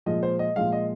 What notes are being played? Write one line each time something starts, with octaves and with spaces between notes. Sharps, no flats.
A#2 F3 G#3 D#5
C5
D#5
A#2 F3 G#3 F5
D#5